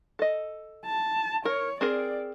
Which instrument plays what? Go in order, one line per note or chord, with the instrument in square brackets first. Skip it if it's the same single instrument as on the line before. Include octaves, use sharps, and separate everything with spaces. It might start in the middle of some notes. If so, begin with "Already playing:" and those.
[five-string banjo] A4 D#5
[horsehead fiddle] A5
[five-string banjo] A#4 [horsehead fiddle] C#5
[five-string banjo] C4 G#4 A#4 [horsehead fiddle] D5